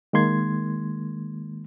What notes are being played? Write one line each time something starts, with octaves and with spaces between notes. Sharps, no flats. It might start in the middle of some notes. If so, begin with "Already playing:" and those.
D#3 G#3 A#3 C6 G#6